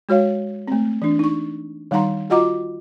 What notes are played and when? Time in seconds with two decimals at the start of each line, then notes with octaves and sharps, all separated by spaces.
0.09 G#3 F#4 C#5 F5
0.68 A3 C4
1.02 E3 D4
1.19 D#4 C#6
1.91 D#3 G3 D#4 F#5 A#5 C6
2.30 F4 F#4 D#5 F#5 A#5 D6